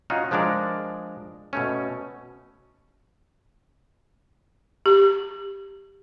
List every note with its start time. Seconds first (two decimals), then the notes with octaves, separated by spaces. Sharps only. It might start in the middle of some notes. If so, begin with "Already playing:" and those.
0.10 C#4 D#4 F4 F#4
0.31 F3 G#3 D4 A#4 D5
1.53 B2 A3 C#4
4.86 G4